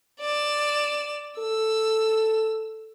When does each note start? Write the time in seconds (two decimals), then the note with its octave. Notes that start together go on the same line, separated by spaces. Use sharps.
0.20 D5 E7
1.39 A4 E6